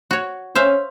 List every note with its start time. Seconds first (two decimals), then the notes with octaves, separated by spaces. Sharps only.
0.11 F#4 C#5
0.55 C#4 C5 E5 F5